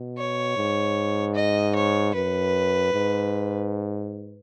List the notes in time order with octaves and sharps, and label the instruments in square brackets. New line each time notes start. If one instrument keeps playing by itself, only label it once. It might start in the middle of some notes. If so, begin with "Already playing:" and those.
Already playing: [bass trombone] B2
[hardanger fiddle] C#5
[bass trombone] G#2
[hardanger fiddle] D#5
C#5
[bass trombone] F#2 [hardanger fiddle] B4
[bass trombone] G#2